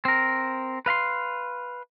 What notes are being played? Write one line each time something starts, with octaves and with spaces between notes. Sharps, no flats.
C4 A#4
B4 F5 B5 C6